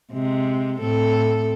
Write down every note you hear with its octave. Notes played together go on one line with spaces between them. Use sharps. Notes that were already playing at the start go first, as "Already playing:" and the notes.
C3 G#3
A2 C4 A4